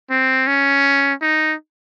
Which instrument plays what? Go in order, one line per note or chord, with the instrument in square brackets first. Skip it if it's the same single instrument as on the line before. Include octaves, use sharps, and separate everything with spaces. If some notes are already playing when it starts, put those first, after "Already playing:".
[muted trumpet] C4
C#4
D#4